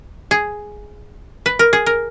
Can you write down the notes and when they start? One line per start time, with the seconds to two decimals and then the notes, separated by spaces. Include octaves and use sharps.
0.31 G#4
1.46 B4
1.59 A#4
1.73 G#4
1.86 A#4